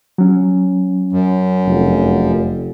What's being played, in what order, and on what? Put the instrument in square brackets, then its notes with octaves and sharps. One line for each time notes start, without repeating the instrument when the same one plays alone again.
[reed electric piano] F#3 C#4
[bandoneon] F#2
[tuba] F1